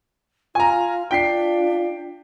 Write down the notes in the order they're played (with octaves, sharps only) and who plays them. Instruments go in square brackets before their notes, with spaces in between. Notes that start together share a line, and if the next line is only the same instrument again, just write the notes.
[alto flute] F4 [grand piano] G#5 A#5
[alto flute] D4 [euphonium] F4 [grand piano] G5 B6 C7